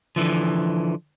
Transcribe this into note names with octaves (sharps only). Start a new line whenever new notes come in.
D3 E3 F3